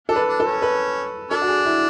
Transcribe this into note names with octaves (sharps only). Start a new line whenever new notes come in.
D4 A4
B4
D4
A4
C#4
B4
D4 A4
F#4
G#4
E4